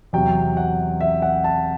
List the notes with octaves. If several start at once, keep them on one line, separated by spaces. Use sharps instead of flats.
E2 C3 F#3 G5
F#5
E5
F#5
A5